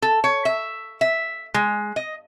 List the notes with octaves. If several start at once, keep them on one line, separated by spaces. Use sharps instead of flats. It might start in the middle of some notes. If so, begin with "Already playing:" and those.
A4
C#5
E5
E5
G#3
D#5